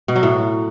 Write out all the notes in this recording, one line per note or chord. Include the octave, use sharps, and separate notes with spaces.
B2
F#3
A2